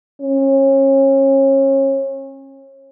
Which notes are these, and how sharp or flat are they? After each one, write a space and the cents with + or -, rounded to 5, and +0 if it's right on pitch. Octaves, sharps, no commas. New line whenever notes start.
C#4 -30